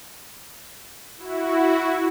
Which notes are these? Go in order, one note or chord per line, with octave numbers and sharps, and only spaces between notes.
E4 F#4